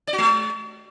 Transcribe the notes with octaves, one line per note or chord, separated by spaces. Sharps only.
D5
F#4
G#3